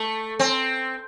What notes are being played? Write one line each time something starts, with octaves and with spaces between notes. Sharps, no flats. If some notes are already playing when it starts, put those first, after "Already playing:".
Already playing: A3
C4